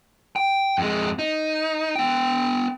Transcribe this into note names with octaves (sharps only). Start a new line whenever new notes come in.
G5
F2 G#3
D#4
B3 G5